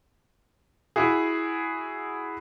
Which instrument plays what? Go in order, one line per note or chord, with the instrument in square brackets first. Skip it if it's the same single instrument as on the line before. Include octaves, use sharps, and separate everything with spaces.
[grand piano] E4 F#4 G#4